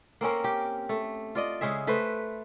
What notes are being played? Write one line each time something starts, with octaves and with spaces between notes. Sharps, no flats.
A#3 C4 C#4 A#4
G4
A3
F4 D5 D#5
C#3 G#3 G#4 E5
A3 B4 C5